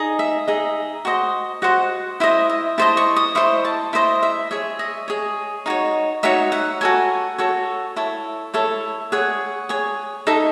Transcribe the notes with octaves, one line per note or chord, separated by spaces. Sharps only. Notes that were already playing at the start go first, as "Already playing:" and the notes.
Already playing: D#4 G#4 D#5
E5
D#4 G#4 D#5
F#4 C5 D#5
F#4 C5 D#5 F#5
E4 C5 D#5 E5
D#5
E4 C5 D#5 A5
C#6
D#6
E4 C5 D#5 C#6
A5
E4 C5 D#5 E5
E5
G#4 C#5 E5
D#5
G#4 C#5
D#4 F#4 C#5
D#4 F#4 C#5 E5
F#5
F#4 A4 C#5 G#5
F#4 A4 C#5
E4 A4 C#5
E4 A4 C#5
G#4 C#5 F#5
G#4 C#5
D#4 A4 D#5 E5